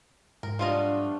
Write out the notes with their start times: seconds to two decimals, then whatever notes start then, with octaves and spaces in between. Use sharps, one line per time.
0.43 G#2 A#4
0.59 F3 G3 A3 B3 D4 F4 D#5